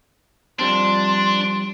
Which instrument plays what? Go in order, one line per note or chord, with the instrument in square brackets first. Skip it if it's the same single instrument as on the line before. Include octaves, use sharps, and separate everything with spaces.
[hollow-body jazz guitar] F3 G3 C4 [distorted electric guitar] D4 [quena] C6